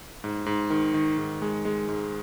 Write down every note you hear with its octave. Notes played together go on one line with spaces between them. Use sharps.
G#2
G#2
D#3
D#3
G#2
G#3
G#3
G#2